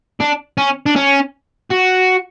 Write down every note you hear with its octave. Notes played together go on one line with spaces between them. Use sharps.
D4
C#4
D4
C#4
F#4